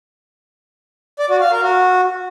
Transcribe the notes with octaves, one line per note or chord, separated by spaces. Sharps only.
D5
F#4
F5
A#4
F#4